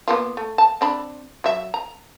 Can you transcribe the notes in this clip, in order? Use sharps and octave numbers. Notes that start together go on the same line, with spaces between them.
A#3 B3 F4
A3
A5
C4 D4 B5
F#3 E5
A#5